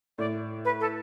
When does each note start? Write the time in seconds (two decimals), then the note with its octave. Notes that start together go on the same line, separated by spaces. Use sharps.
0.18 A2 D5
0.65 B4
0.80 A4